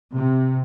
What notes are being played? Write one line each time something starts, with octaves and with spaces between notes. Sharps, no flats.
C3